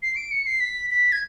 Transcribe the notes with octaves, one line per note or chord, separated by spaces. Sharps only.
C7
D7
C#7
C7
B6
B6
G#6